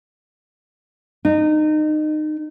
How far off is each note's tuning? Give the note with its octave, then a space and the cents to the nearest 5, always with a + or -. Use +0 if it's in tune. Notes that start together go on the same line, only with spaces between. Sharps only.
D#4 -25